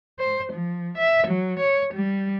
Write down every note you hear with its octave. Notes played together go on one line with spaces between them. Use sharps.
C5
F3
E5
F#3
C#5
G3